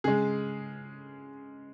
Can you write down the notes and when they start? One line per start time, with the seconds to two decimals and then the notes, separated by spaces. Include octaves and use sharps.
0.04 C#3 G#3 G#4